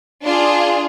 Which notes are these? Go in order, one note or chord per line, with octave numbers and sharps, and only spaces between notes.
D4 F4 G#4